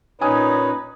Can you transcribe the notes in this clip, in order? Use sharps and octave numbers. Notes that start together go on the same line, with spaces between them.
A#2 C#4 D#4 B4 C#5 G#5 D#6